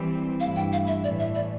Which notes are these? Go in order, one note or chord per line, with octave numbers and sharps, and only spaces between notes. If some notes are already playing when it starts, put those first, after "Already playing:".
Already playing: E3 G3 C4
G2 E3 A3 E4 F5
G5
F5
E5
A2 E3 A3 D5
E5
D5